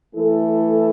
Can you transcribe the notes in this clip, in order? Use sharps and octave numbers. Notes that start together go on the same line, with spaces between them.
E3 A3 E4 A4